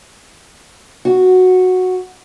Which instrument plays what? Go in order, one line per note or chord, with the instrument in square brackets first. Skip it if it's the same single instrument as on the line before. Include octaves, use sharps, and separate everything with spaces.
[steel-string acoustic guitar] F#4